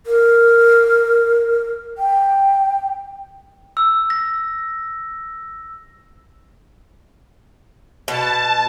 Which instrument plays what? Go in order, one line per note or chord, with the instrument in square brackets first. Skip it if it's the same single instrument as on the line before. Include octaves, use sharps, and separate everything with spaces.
[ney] A#4
G5
[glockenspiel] E6
A#6
[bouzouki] B2 [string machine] A5